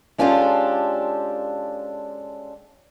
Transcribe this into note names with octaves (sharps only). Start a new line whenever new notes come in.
G#3 C#4 D4 F4 G4 A4